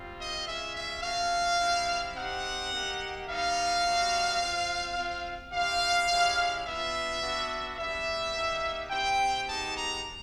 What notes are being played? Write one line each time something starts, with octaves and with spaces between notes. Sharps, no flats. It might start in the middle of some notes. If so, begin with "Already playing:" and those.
Already playing: G3 C4 F4
D#5
G#3 C#4 F4 E5
E5
A3 C#4 F#4 F5
G3 C4 E4
C4 D#4 G4 F#5
A#3 D#4 G4
G3 B3 D#4 F5
G3 B3 D#4 F#4
C4 F4
C4 F4
C4 E4 G4 F5
G#3 C#4 E4 G4
B3 D4 F4 E5
B3 D4 F#4
G3 B3 D4 E5
A#3 D#4 G4
C4 E4 G4 G5
G#3 B3 D#4 G4 A5
A#5